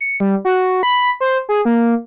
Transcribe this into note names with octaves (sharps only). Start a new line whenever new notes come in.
C#7
G3
F#4
B5
C5
G#4
A#3